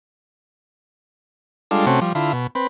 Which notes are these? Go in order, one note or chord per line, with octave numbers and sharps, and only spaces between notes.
G3 G#3 D4 F4 A4
C3 A3 C4 C#4 F#4
F3 G3
D3 E4 F4
B2
C4 B4